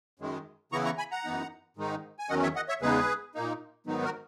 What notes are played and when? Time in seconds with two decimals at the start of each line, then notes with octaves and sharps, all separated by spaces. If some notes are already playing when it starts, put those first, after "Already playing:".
0.19 F#2 D#3 G#3
0.72 C#3 E3 B3 E4 A#5 C#6
0.85 A#5 C#6
0.98 G#5 B5
1.11 F#5 A#5
1.24 F#2 E3 B3 D#4
1.77 G#2 D#3 G#3 D#4
2.19 G#5
2.29 E2 D#3 F#3 C#4 D#5 F#5
2.43 C#5 E5
2.56 D#5 F#5
2.69 C#5 E5
2.81 E2 C#3 G#3 B3 D#4 G#4 B4
3.35 A#2 A#3 D#4
3.86 G#2 D#3 F#3 B3 D#4
4.04 F#4 A#4